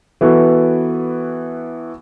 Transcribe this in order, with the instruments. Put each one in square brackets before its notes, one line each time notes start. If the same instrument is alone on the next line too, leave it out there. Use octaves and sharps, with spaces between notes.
[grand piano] E3 B3 F#4 A4